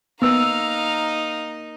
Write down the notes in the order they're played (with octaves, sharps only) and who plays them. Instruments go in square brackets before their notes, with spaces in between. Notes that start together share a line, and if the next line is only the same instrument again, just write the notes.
[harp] A#3 E6 [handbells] B3 B4 [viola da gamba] D#4 [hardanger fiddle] F5 A#5